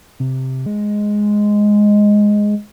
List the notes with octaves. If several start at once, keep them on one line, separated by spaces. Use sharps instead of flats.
C3
G#3